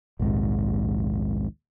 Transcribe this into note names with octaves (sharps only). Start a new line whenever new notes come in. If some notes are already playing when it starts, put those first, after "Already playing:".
A#1 D#2 G#2 C3